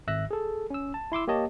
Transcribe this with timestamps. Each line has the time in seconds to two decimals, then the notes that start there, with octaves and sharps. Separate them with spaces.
0.08 G#1 E5 E6 F#6 A#6
0.31 G#4 A4
0.70 C#4 E6
0.94 A5
1.12 E4 C6 D6 E6
1.28 A#3 G4 C#5 D#5 A5